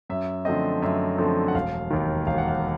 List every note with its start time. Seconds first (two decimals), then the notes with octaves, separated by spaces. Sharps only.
0.10 F#2 E5
0.45 D3 F3 A3 C4 D#5
0.82 F#2 E5
1.18 D3 F3 A3 C4
1.48 F#5
1.55 E1 F5
1.91 D#2 D#3
2.27 E1 F5
2.38 F#5
2.48 F5